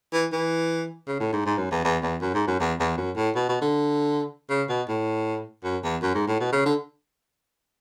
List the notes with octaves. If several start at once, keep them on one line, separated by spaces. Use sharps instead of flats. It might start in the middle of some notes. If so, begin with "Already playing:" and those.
E3
E3
C#3
A2
G#2
G#2
F#2
E2
E2
E2
F#2
G#2
F#2
E2
E2
F#2
A2
B2
B2
D3
C#3
B2
A2
F#2
E2
F#2
G#2
A2
B2
C#3
D3